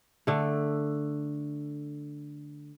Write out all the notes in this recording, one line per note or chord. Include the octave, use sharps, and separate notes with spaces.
D3 A3